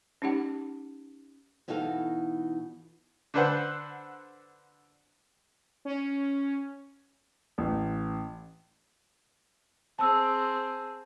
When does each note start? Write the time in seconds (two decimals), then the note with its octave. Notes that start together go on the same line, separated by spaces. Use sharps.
0.22 C#4 D#4 G4 F#5
1.68 B2 E3 D#4 F#4 A4 F5
3.34 D3 D4 B4 C5 F#5
5.85 C#4
7.58 A1
9.99 C4 G#4 A5 E6